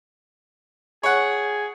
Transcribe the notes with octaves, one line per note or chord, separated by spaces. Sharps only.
G#4 C#5 F#5